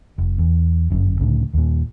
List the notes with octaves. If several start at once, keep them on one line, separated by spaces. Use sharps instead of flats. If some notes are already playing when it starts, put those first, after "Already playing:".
F1
E2
G1 F#2
C#2 A2 D3
D#2 A#2